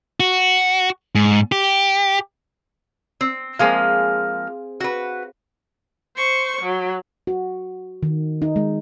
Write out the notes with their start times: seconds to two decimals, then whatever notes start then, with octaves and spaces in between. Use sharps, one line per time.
0.20 F#4
1.15 G#2
1.52 G4
3.21 C4
3.59 F3 G#3 A#3 C4 G#4 F5
4.80 F#4 B4
6.16 C5 C#6
6.62 F#3
7.27 F#4
8.03 D#3
8.42 D#4
8.56 G#3